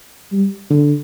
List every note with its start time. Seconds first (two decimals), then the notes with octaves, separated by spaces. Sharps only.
0.32 G3
0.70 D3